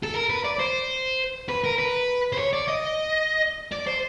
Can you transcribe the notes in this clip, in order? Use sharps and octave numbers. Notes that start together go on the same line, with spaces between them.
A4
A#4
B4
D5
C5
B4
A#4
B4
C5
C#5
D5
D#5
D5
C5